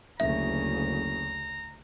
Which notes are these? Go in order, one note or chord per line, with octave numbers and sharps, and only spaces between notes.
F#1 D2 C#3 E5 A#5